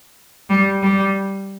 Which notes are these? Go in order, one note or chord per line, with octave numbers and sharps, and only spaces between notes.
G3
G3